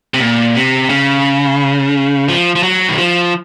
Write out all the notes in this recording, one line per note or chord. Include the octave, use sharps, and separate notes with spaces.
C3
A#2
C3
C#3
F3
F3
F#3
D#3
F3